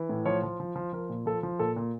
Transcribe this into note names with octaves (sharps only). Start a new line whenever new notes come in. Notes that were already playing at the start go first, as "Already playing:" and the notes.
Already playing: E3
A2
F3 C#5
F3
F3
F3
F3 A#4
A#2
F3 A4
F3
A#2 A4
A#2